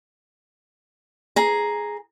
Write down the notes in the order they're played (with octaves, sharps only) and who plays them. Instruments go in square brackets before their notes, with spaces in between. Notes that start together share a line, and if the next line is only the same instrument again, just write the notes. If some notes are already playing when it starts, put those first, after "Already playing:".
[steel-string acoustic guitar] G#4 A#5